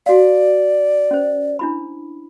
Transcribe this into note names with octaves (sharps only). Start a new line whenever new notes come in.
F#4 D5 F5
C#4 C5
D4 E4 B5